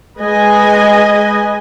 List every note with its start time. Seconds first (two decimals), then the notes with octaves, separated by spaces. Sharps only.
0.20 G#3 B4 D#5 G#5